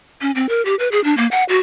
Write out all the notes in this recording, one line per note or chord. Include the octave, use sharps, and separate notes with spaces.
C#4
C4
A#4
G4
B4
G#4
D4
A#3
F#5
F#4